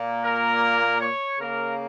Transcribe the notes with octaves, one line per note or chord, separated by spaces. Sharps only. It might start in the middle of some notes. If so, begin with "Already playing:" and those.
Already playing: A#2 A#3
A#4
C#5
C#3 A#3 A#4